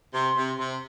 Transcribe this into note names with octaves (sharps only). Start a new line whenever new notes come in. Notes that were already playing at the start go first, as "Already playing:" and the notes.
C3 C6
C3
C3